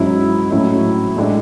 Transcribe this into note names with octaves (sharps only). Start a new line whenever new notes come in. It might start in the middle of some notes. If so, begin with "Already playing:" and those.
Already playing: G#2 F#3 C#4 E4
A2 F#3 C#4 E4
A1 A2 G#3 D4